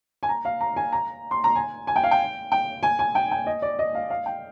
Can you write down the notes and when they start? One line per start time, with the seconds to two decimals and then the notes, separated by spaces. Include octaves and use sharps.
0.23 G#5
0.29 A#5
0.45 F5
0.60 A#5
0.76 G#5
0.92 A#5
1.31 C6
1.44 A#5
1.55 G#5
1.87 G#5
1.96 G5
2.03 F5
2.11 G5
2.52 G5
2.83 G#5
2.99 G#5
3.15 G5
3.31 G5
3.47 D#5
3.62 D5
3.79 D#5
3.95 F5
4.10 F5
4.26 G5